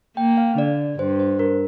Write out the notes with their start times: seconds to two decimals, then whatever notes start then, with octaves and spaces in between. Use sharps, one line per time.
0.17 A#3 G5
0.37 F5
0.57 D3 D5
0.99 G2 C5
1.19 C5
1.39 A#4